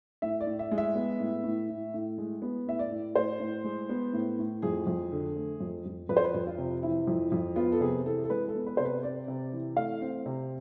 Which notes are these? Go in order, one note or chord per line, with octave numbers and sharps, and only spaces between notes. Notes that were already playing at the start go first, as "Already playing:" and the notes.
A2 E5
D5
A2
E5
G#3
E5
B3
A2
A2
A2
A2
G#3
B3
A2 E5
D5
A2
A2 C5
A2
G#3
B3
A2
A2
F2 G#4
F2
D3
A3
F2
F2
F2 B4
C5
B4
F2
F4
C3
E3 E4
F2
F2
B3 F4
A4
C3 G#4
E3 A4
A4
G#3 B4
A4
B3
B4
C3 C5
B4
C4 D5
C3
E3
A3 F5
C4
C3